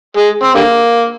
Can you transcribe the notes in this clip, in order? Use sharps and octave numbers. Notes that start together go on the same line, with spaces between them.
G#3
C4
D3 G3 A#3